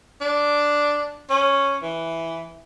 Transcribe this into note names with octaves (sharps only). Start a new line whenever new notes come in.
D4
C#4
E3